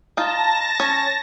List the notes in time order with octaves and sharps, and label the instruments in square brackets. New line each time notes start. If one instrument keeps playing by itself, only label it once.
[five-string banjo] D#4 F4 [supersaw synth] A5 A#6
[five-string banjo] C#4 C#5